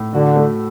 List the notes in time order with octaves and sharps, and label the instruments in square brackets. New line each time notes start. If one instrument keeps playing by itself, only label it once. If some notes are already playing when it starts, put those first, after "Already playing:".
Already playing: [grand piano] A2
[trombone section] D3 [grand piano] F#4
[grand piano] A3